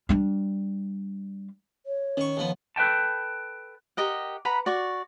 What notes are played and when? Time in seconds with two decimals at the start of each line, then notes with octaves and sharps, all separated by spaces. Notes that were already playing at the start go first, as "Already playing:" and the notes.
0.09 G3 D4
1.86 C#5
2.17 D#3 C#4 C#6
2.37 D#2 F3 B3
2.76 A4 B4 E5 G5 A5
3.97 G4 A#4 D#5 F#5
4.45 B4 F#5 A#5 B5
4.66 F#4 D5 C#6